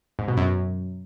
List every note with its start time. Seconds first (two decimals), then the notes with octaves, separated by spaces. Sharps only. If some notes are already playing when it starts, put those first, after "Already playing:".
0.19 G#2
0.28 B2
0.37 F#2